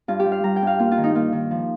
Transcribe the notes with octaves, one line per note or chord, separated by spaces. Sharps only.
G2 F4
G4
G3
F5
G3 A#5
G5
G2 F5
A#3 F4
F4
D#3
D#4
A#3 F4
D#3
F3